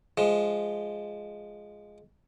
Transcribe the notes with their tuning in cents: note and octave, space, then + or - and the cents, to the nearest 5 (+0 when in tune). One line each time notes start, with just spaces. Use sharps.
F3 -5 G#3 +0